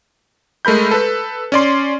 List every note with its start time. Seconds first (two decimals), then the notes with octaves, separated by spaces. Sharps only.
0.65 G#3 A3 A#4 B5 G6
0.91 A4 B4
1.52 C#4 D5 C6